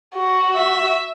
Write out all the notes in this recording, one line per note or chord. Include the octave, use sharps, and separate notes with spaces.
F#4
E5